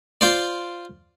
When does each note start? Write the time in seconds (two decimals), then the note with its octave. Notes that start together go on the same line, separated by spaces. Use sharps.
0.21 F4 C5 D5